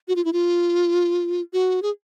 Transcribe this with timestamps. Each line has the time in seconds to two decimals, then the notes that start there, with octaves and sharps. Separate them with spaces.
0.08 F#4
0.16 F4
0.25 E4
0.33 F4
1.53 F#4
1.83 G#4